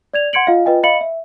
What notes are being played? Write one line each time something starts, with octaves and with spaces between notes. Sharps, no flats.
D5 G#6 F7
F#5 C6 G#6 C#7 D7 F#7
F4 D#5 F5
F4 B4 D#5 G5 G#5
D#5 F5 B5 C#7 F#7
E5